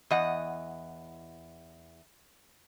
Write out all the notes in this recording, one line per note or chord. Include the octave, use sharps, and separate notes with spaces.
E2 D#5 F#5